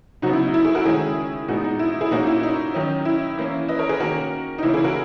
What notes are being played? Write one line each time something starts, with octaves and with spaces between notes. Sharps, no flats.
C#3 F#3 B3 D#4 F#4
E4
D#4
E4
E4 G#4
F#4 A#4
D#3 G#3 C#4 E4 G#4
A#2 G#3 B3 D#4 F#4
D#4
E4
E4 G#4
A#2 A#3 C#4 D#4 F#4
E4
D#4
D#3 F#3 C#4
E4
E3 A#3 C#4
B4 D#5
A#4 C#5
G#4 B4
D#3 A#3 C#4 F#4 A#4
D#4
C#3 E3 A#3 C#4 E4
E4 G#4
F#4 A#4